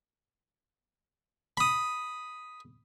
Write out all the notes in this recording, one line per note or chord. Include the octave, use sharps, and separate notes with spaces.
B5 D#6